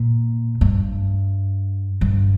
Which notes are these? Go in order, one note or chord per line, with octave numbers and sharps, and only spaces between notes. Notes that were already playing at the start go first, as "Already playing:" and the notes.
Already playing: A#2
G2
G2